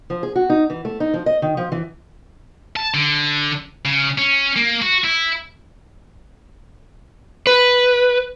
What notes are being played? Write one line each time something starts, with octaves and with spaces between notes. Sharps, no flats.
F3
G#4
F#4
D#4
E3
A3
D#4
F3
D#5
D#3
F3
E3
A5
D3
C#3
C#4
A#3
F#4
E4
B4